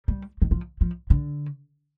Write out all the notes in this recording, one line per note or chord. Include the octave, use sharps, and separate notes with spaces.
G3
D#3
F3
F3
D3